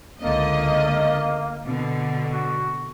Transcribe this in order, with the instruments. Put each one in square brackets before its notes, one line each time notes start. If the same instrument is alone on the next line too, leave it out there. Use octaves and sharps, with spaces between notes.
[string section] C#2 D3 D#5 [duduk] A#3
[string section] B2 D3
[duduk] F#4